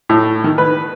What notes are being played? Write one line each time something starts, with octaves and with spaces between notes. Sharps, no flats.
A2
D#3
B4